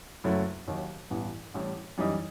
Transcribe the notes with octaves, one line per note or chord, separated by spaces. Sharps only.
F#1 F#2 F#3 A3 E4
D#2 D#3 F#3
A1 G2 E3 B3
A1 A2 G3
F#2 E3 G3 D#4